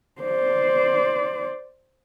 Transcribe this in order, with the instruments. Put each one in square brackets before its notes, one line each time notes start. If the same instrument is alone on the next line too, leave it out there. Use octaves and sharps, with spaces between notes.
[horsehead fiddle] C5 D5